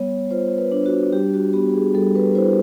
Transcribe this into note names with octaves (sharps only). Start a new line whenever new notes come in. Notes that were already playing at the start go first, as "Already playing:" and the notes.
Already playing: G3 B3 C#5
F4 C5
B4
D4
F#4
G3 G4
F#4
B3 G4
G#4
G3 A4
B4
E4 C5